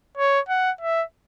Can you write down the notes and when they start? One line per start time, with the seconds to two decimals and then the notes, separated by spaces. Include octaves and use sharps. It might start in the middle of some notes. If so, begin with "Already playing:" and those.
0.18 C#5
0.49 F#5
0.81 E5